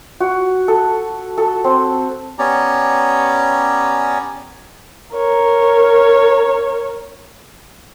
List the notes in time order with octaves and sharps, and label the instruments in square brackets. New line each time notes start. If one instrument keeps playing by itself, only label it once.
[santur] F#4
A4
A4
C4
[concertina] B3 C#4 G4 C#5 D5 A#5
[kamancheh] A#4 C#5